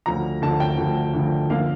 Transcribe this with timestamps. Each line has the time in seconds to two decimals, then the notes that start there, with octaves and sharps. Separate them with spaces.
0.06 D2 D3 F3 A#5
0.42 D2 D3 F3 A5
0.60 G5
0.78 D2 D3 F3
1.14 D2 D3 F3
1.50 D3 F3 A#3 F5